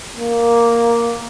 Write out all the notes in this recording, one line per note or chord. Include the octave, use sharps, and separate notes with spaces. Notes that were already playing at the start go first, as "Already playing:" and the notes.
A#3